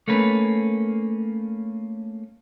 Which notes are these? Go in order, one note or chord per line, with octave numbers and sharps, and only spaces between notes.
A3 A#3 C#4 B4